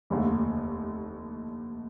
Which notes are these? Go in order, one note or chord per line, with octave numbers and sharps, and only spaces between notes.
F1 D#2 D3 A3